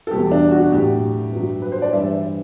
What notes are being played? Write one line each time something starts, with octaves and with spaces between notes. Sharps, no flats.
A4
E2 B2 G3 G4
D4
F#4
A2 F#3 G4
G2 F#3
B4
C5
D5
G2 E3 G3 E5